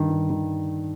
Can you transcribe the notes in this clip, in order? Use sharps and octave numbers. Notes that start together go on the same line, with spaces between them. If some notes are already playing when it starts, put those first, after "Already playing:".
Already playing: G2 D#3
G2
D#3